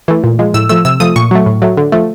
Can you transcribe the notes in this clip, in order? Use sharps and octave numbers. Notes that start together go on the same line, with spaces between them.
E3 A3
A#2
F3 G#3
A2 E6
F3 A3 E6
C3 E6
F3 A3 D#6
A#2 C#6
F#3 A3
A2
F#3 A3
D3
F3 A3